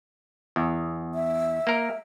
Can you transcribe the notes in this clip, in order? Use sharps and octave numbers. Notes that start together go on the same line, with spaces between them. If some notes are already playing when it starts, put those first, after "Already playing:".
E2
E5
A#3 A#4